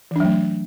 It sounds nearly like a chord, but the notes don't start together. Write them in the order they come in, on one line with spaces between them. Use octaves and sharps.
E3 D4 F#3 A3